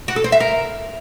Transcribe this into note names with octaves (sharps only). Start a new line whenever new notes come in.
F#4
A4
C5
E5
A#4